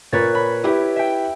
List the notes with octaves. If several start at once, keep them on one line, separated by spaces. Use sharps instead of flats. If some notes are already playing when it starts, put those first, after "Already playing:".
A#2 A#3 B4 C#5 A6
B5
E4 G4 B4
E5 G5